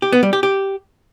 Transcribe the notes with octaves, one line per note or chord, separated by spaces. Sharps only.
G4
B3
G3
G4
G4